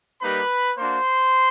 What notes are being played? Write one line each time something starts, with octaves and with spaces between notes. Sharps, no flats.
G3 A#3 D#4 G4 B4 B5
A#3 D4 F#4 C5 C6